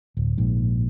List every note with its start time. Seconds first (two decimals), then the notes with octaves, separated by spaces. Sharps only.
0.17 D1
0.38 A#1 G#2